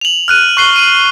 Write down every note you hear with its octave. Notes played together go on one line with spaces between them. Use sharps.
F7 F#7
F6 F#6 D#7
C#6 F#6 C7 G7
D#7 F#7